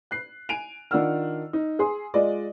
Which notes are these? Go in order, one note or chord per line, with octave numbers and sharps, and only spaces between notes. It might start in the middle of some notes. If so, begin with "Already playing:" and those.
F#6 C7
G#5 D7 D#7 F7
D#3 D4 F4 F#5 E6 F6
D#4
G#4 C6 D#6
G#3 F4 D5 D#5